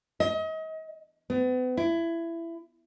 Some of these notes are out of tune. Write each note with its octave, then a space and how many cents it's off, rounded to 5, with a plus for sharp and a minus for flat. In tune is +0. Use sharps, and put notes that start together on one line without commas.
D#5 +35
B3 +40
E4 +20